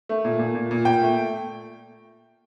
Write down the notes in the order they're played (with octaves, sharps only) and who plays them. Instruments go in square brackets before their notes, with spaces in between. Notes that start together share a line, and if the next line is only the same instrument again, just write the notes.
[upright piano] A3
A#2
A#2
A#2
A#2
A#2 G5
A3